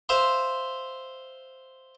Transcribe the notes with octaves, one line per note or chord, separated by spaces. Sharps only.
C5 E5 F5 C6